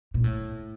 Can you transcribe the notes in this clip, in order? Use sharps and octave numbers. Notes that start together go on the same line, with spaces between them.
A#2
A2